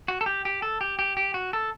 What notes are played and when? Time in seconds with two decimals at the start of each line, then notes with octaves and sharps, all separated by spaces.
0.08 F#4
0.21 A4
0.26 G4
0.45 G4
0.62 A4
0.81 G4
0.99 G4
1.17 G4
1.34 F#4
1.53 A4